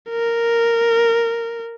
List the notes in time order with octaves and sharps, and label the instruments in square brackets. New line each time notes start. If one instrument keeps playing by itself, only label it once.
[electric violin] A#4